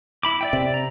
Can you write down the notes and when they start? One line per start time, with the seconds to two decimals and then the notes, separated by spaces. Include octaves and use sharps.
0.23 E4 B5 D6
0.41 D5 E5 G5
0.53 C3
0.74 A#5